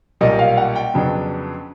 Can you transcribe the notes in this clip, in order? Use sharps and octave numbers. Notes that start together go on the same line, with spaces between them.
B1 A#2 G3 A#3 D#5
F5
F#5
G5
F2 C#3 F#3 B3 D4